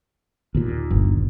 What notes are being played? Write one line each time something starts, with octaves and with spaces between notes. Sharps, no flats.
D#2 A#2
G1